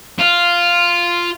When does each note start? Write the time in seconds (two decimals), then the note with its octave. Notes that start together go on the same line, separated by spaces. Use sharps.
0.19 F4